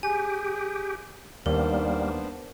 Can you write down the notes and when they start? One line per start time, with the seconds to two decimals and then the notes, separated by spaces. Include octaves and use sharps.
0.03 G4 G#4 G#5
1.46 D#2 G3 A#3 B3 D4 A#4 C5